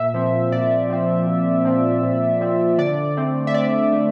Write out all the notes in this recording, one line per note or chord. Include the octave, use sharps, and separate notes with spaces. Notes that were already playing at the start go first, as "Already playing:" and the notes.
Already playing: A#2 E5
F3 C4
A#2 D5
F3 C4
A#2
F3 C4
A#2
F3 C4
D3 D5
A3 C4
E5
D3 D5
A3